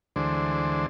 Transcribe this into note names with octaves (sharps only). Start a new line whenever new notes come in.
D2 D3 E3 G#3 D4 C5